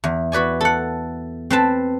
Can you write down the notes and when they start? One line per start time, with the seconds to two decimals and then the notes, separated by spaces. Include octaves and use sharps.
0.04 E2
0.32 F#4 B4 D5 G#5
0.61 A4 F#5
1.50 C4 B4 A5